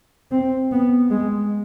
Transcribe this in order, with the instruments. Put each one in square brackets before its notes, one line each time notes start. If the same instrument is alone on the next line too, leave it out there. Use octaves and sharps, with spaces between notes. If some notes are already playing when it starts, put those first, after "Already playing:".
[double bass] C4
B3
G#3